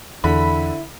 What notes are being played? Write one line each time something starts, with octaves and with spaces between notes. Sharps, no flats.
E2 D3 E4 B5